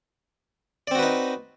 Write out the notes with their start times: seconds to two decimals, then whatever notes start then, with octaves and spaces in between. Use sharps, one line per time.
0.87 D5
0.91 C4
0.95 F#4
0.99 B4
1.03 D#4